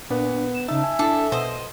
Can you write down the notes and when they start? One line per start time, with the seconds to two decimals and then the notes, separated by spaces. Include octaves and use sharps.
0.11 A#2 B3 D4
0.55 E7
0.68 C#3 D#4 E5 A5
0.84 G#5
0.99 D4 E4 A4
1.32 B2 C5 D#5